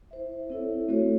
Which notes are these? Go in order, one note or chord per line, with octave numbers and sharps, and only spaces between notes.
E4 C5 E5
C4 E4 A4 C#5 E5
A3 C4 F#4 A4 C#5